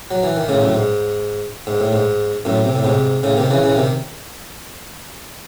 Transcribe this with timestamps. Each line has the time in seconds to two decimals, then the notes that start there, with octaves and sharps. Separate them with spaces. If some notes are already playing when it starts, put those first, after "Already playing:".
0.11 F#3
0.23 E3
0.37 D#3
0.48 A2 C#3
0.61 F#2 A2
0.75 G#2
1.67 G#2
1.80 A2
1.93 G#2
2.45 F#2 A2
2.65 C3
2.75 A2
2.85 G#2 C3
3.23 A2 C#3
3.37 C3 D#3
3.50 C#3 E3
3.63 C#3 E3
3.76 C3 D#3